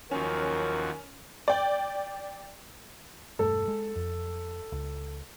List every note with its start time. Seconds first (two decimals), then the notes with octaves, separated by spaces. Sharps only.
0.11 D#2 F3 F#3 C#4 F#4 A#4
1.48 D5 G5
3.39 E1 G2 A3 A4
3.68 G#3
3.96 F2
4.72 C#2